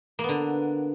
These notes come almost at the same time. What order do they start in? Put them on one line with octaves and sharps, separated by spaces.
A#3 B3 D3